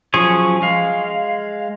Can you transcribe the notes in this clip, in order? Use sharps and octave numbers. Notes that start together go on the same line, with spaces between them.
F3 F#3 C#4 G#4 C#5
G#3 F5